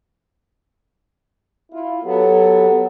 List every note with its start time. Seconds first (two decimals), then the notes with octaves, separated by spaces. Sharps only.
1.72 E4 F4
2.04 F#3 B3 G4 A4